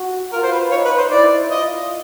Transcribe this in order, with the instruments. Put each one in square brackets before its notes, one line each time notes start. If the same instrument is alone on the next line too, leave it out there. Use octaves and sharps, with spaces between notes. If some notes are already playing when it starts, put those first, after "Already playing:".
Already playing: [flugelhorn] F#4
[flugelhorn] F4 [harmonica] A#4
[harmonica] C5
B4
[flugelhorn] D#4 [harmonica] C#5
[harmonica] B4
C5
[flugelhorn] E4 [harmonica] D5
[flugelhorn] F4 [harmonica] D#5